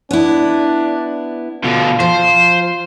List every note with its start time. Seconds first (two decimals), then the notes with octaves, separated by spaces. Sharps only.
0.11 B3 D4 E4
1.64 B2 D3 F4
2.00 F3 C5